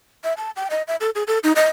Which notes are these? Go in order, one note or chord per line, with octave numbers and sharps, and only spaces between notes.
E5
A5
G5
D#5
E5
A4
G#4
A4
D#4
D#5